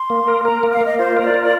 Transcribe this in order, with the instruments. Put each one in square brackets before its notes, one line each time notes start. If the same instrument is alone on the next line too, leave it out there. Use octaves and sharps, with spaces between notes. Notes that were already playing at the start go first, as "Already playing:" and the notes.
Already playing: [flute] C6
[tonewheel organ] A#3
A#4
[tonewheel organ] A#4 [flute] A#5
[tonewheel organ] A#3
[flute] F5
[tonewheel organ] A#3 [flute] D#5
[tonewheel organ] F4 [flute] C5
[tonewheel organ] A#4 [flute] C5
[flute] D5
[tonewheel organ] F4
[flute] D5